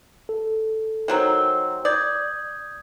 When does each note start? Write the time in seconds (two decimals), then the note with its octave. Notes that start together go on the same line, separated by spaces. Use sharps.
0.29 A4
1.08 D#3 F#3 C4
1.85 D5 D#6 G6 G#6